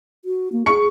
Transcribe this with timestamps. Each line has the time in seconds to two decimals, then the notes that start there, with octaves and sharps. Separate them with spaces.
0.25 F#4
0.52 A#3
0.66 G#4 C#6 C#7